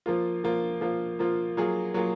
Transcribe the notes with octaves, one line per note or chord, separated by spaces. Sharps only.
F3 A#3 F4
F3 A#3 F4
F3 A#3 F4
F3 A#3 F4
F#3 A#3 F4 G#4
F#3 A#3 F4 G#4